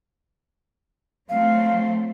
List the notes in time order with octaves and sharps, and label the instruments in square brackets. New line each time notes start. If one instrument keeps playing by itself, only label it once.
[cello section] F#3 A3 C4 [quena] F5